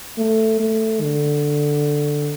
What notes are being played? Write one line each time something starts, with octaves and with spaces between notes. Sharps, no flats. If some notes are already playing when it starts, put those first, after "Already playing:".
A3
A3
D3